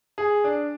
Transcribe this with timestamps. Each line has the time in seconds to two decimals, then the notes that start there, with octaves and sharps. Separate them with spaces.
0.18 G#4
0.44 D4